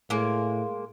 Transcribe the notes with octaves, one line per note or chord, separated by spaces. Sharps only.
A2 G#3 A#3